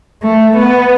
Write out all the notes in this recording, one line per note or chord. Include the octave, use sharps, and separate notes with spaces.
A3
B3